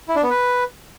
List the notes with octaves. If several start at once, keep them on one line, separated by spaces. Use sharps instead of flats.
E4
D4
B3
B4